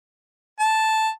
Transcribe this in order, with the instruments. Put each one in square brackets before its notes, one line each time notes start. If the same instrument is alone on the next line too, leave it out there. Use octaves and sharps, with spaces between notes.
[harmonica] A5